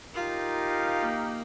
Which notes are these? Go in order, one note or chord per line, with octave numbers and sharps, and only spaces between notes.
D#4 F4 G4 A#4 F5
A#3